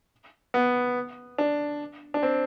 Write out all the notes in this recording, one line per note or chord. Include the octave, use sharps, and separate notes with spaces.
B3
D4
D4
C4